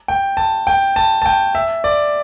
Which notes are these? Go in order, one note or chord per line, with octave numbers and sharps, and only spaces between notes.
G5
A5
G5
A5
A5
G5
E5
D5